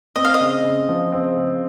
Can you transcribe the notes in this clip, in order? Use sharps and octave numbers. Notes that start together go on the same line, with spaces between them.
C4 D#5
F5
D#5
C#3
C#3
F3
C4
C#3